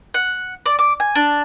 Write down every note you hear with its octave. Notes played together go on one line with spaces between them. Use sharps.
F#5
D5
D6
G#5
D4